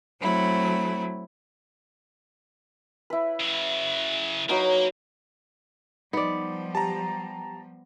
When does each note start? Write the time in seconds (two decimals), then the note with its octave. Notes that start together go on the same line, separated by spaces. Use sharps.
0.21 F#3 A3 C4 E4
3.10 E4 B4
3.40 C#3 F#3
4.49 F#3 A#3 D#4 B4
6.13 F3 G3 B3 D#4 D5
6.75 G4 A5 A#5